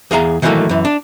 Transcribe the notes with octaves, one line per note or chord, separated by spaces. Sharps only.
E2 G#4 F5 A#5
D#3 E3 F#3 G3 A3 A#3
F#2 E3
D4